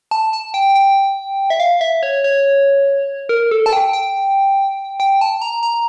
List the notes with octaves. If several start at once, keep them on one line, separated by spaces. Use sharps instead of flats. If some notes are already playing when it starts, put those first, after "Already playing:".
A5
A5
G5
G5
E5
F5
E5
C#5
C#5
A#4
A4
A5
G5
G5
G5
A5
A#5
A#5